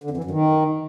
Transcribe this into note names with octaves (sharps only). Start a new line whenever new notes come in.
D3
F2
E3
F#2
D#3